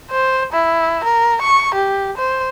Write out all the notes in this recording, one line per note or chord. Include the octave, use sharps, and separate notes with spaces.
C5
E4
A#4
C#6
G4
C5